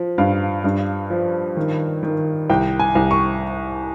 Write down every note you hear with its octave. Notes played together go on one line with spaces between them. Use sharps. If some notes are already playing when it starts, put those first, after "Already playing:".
Already playing: F3
G2 F5
G2
F3
D#3
D#3
C2 G5
G#5
C2
C#6